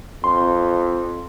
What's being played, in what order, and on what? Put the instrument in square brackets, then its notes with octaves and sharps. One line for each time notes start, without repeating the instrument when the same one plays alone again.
[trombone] F2 [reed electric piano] C6